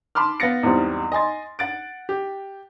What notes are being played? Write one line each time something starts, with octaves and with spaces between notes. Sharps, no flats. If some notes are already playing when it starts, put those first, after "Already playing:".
A5 B5 C6 D6 F6
B3 F5 A6 A#6 C#7
E2 G#2 E3 G3 C4
D#5 G#5 C6 A6
F#5 A6 D7
G4